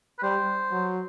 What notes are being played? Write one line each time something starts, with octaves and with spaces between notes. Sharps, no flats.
B4
G3 C5
F#3